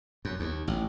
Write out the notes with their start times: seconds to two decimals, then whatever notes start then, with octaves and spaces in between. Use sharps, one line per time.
0.25 F#2
0.40 D#2
0.68 A1